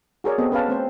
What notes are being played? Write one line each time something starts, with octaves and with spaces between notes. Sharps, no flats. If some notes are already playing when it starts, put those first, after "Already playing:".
F#4 G#4 A#4 C#5 D5
B3 C4 F#4 G#4 A4 D#5
C#4 B4 F5 A5
A3 C4 C5